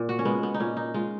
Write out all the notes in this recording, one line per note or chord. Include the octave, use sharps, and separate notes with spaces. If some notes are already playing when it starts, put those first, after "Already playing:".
Already playing: A#2
F#4
C#4
G#3 B3
B3
D#4
A#2 C#4
D#4
G#3 F4